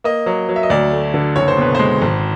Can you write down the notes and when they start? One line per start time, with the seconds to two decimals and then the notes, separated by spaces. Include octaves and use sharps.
0.04 A#3 D#5
0.26 F#3
0.49 F#3
0.56 E5
0.63 D#5
0.70 D2 D5
0.91 A3
1.14 D3
1.36 F#1 C#5
1.48 C5
1.57 B2 B4
1.75 G#3 C5
2.02 G#1